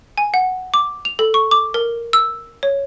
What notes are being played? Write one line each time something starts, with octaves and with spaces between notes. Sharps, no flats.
G#5
F#5
D6
F7
A4
C#6
D6
A#4
E6
C#5